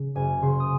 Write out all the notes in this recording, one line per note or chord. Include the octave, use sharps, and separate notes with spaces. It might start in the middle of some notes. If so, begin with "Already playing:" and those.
Already playing: C#3
F#1 G#5
C#3 C6
D#6